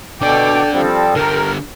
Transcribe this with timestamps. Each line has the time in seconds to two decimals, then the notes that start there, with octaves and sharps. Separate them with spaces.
0.21 B2 D3 A4 D5 G5 D6
0.73 F3 G3 C4 A4
1.15 D3 G4 A#4